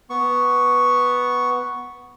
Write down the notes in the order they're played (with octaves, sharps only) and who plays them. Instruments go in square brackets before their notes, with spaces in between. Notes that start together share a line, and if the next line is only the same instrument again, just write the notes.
[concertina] B3 C#6